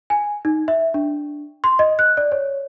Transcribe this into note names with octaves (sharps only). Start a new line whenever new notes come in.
G#5
D#4
E5
D4
C6
D#5
F#6
D5
C#5